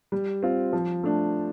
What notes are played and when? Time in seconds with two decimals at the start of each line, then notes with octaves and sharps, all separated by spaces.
0.12 G3
0.43 C4 F4
0.73 F3
1.03 A3 D4